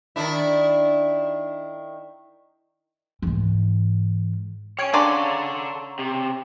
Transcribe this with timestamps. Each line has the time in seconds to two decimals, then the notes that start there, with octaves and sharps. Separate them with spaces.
0.16 D#3 D4 E4
3.22 G#2 E3
4.79 C#5 G5 G#5 G#6 D7
4.94 C#3 D4 A4 D5 F#5 A#5 C6 C#6
5.99 C3